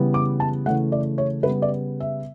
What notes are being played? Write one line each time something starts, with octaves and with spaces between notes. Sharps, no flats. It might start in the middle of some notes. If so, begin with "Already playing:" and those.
Already playing: C#3 E3 G3 B3
D6
A5
C#3 E3 A3 F#5
D5
C#5
C#3 G3 B3 B4
D5
E5